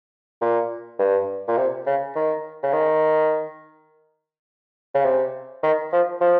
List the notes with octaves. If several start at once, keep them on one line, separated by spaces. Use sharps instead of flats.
A#2
G2
A#2
C3
C#3
D#3
C#3
D#3
C#3
C3
D#3
F3
F3